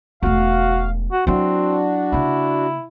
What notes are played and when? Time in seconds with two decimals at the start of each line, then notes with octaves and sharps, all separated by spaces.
0.23 E1 A3 F#4 F5
1.12 F#4
1.27 F#3 C4 D4 E4 F#4
2.12 C#3 A#3 E4